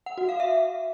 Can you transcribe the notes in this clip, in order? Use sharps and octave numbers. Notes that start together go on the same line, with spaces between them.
F#5
F#4
F5
E5